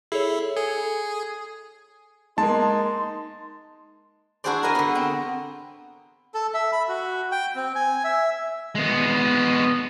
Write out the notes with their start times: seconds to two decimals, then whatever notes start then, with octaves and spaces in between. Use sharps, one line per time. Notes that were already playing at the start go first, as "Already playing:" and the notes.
0.12 E4 G#4 A4 C#5
0.56 G#4 A4
2.38 G#3 A#3 D#4 A5 C6
4.44 D4 E4 F#4 G#4 C5 D5
4.63 A#4 B4 D#5 G#5
4.75 D3 B3
4.95 C4
6.34 A4
6.54 E5
6.72 B5
6.88 F#4
7.32 G5
7.56 C4
7.75 G#5
8.04 E5
8.75 G#3 B3